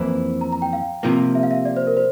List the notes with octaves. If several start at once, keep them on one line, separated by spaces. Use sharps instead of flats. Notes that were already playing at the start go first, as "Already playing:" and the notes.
Already playing: F2 E3 A#3 E4 C5
A#5
A#5
G5
F5
C3 F3 A#3
E5
F5
E5
D5
C5
A#4
C5